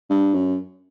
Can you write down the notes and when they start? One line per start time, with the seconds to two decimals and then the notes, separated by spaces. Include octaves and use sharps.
0.10 G2
0.34 F#2